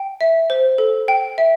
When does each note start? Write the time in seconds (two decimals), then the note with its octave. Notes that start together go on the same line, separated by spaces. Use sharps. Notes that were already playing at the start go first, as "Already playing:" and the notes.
Already playing: G5
0.21 E5
0.50 C5
0.78 A4
1.08 G5
1.38 E5